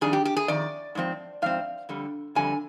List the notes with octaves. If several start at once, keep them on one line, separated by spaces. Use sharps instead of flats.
F2 D#3 G3 D4 G#4
G4
G4
G#4
F2 D#3 D5
G#2 F3 C4
G#2 F3 C4 F5
F2 D3 G3
F2 D3 G3 G#5